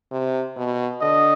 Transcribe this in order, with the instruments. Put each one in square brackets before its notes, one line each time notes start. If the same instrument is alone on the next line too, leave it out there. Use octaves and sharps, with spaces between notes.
[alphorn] C3
B2
[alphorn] D3 [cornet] D#5